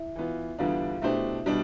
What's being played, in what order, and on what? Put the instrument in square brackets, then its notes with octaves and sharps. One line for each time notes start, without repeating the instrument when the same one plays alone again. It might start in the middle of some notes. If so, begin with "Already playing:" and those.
Already playing: [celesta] E4 E5
[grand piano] E3 B3 F4
[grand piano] E2 D3 G3 B3 D4 [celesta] F4 F5
[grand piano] B2 A3 D4 G4 C5 [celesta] E4 E5
[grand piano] B2 G3 D4